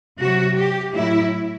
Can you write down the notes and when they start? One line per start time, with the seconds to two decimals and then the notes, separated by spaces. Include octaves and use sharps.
0.20 C3 F#3 F#4
0.57 G4
0.95 A2 F#3 E4